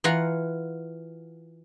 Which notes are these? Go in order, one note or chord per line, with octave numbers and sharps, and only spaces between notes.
E3 F4 F#5 A#5